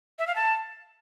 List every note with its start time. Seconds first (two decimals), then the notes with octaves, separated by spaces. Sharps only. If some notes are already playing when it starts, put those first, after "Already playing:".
0.19 E5
0.27 F5
0.36 A5